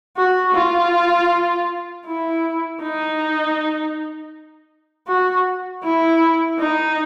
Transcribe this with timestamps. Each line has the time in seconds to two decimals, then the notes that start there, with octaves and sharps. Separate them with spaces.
0.17 F#4
0.55 F4
2.07 E4
2.81 D#4
5.08 F#4
5.83 E4
6.59 D#4